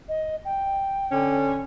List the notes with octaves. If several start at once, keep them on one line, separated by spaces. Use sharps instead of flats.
D#5
G5
D3 C#4